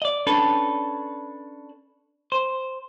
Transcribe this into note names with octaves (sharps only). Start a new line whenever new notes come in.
D5 D#5
C#4 D4 A4 B4
C5